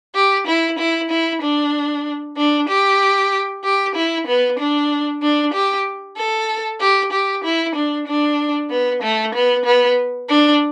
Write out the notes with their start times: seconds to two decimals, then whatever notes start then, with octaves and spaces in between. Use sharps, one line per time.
0.15 G4
0.47 E4
0.79 E4
1.10 E4
1.42 D4
2.37 D4
2.69 G4
3.64 G4
3.95 E4
4.27 B3
4.59 D4
5.22 D4
5.54 G4
6.17 A4
6.80 G4
7.12 G4
7.44 E4
7.75 D4
8.07 D4
8.70 B3
9.02 A3
9.34 B3
9.65 B3
10.29 D4